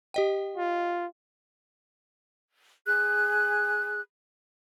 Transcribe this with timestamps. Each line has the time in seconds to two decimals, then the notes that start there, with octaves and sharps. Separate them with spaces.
0.14 G4 D#5 G5
0.57 F4
2.86 G#4 F#6